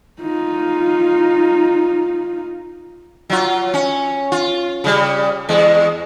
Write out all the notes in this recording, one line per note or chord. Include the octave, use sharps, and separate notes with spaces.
D#4 F4
F#3 F4
C#4
F4
C#3 G3
E2 G#3